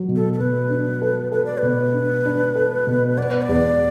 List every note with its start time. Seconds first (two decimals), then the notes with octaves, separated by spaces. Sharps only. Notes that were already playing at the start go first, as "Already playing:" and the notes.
Already playing: F#3
0.08 B2
0.16 A4
0.33 A4
0.39 B2 B4
0.70 D4
1.02 A4
1.32 A4 B4
1.46 D5
1.59 B2 B4
1.94 D4
2.26 D4
2.55 A4
2.87 B2
3.17 B3 D5
3.31 B4
3.43 D5
3.49 E2